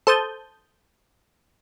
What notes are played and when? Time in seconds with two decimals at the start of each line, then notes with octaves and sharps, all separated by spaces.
0.07 A4 C5 A5 D#6 G6